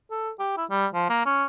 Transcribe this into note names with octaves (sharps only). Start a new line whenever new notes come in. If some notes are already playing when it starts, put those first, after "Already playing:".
A4
G4
E4
G3
F3
A#3
C#4